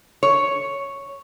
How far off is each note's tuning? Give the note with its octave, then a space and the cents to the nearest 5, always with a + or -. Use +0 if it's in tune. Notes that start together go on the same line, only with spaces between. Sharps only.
C#5 +0